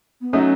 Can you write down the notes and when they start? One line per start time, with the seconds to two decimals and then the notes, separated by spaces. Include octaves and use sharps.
0.21 B3
0.33 F#3 A3 C#4 D#4 F#4